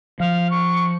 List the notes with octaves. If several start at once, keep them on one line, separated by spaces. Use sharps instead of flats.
F3 F5
C#6